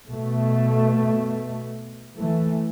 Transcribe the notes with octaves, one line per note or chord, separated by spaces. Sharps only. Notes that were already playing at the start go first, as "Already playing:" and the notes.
B2 A3
E3 A3